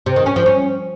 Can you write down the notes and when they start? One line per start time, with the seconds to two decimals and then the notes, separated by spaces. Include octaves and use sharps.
0.06 C3
0.16 D#3
0.26 C#4
0.36 F3
0.46 C#4